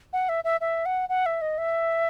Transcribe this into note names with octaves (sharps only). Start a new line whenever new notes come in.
F#5
E5
E5
E5
F#5
F#5
E5
D#5
E5